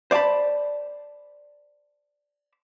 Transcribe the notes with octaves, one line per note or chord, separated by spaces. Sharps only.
C5 D5 E5 A5 B5